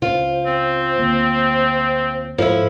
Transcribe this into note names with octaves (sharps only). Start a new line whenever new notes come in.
C#2 C#3 F4 C5
C4 C5
D2 A#3
G#2 F3 E4 A4